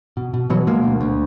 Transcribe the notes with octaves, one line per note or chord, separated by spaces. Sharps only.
B2
B2
B2 E3 F#3
B2 G#3 A#3
D2
D2